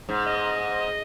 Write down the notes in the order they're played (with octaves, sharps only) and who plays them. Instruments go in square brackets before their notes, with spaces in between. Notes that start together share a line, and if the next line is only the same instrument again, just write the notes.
[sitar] G#2
[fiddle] D#5